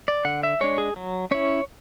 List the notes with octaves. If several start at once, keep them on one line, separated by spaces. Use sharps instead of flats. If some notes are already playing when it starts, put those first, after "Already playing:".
D5
D3 F#5
E5
G#3 D4 C#5
G#4
F#3
C#4 E4 C#5